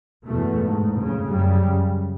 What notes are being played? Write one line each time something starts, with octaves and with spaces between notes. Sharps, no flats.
E2 B2 A3
G#2
F2 C#3
F#2 C#3 G3